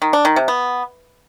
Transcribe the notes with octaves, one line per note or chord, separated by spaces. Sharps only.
D#3
D4
D#3
C3
B3